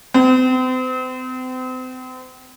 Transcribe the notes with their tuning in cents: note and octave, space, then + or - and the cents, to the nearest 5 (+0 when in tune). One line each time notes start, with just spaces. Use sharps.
C4 -40